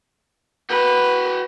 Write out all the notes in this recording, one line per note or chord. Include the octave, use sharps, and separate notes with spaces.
F#4 B4 G5